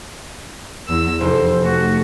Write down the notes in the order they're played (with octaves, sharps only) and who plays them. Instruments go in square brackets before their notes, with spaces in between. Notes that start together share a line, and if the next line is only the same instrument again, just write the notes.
[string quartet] E2 E6
[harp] F1 D#4 [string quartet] C5
[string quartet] A3 F#4